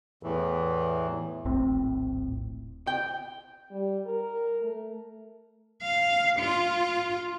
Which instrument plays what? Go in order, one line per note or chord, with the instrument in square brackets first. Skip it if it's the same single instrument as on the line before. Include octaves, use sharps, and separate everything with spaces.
[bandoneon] E2 A2 E3
[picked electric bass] D#1 A#1 A2 C4
[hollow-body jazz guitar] G5
[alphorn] G3
A#4
A3
[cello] F5
F4